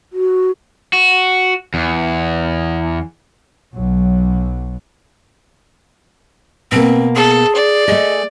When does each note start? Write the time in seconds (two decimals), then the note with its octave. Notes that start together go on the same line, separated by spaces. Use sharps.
0.13 F#4
0.93 F#4
1.74 E2
3.74 B1 F#3
6.72 B2 A#3 C4
7.16 G#4 A4
7.55 D5
7.88 A3 G#4 D#5